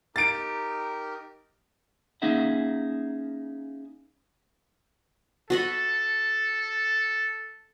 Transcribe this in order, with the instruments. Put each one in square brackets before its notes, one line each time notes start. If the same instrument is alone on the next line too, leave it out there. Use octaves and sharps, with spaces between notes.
[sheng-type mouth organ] D#4 G4 A#4 [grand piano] A6 D7
[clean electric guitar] A#3 C#4 D#4 G#4 E5 F#5
[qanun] F#4 D#5 B5 [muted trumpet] A4